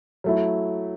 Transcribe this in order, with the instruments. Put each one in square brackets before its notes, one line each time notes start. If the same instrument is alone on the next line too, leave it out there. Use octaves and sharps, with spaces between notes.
[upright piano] F#3 A3 E4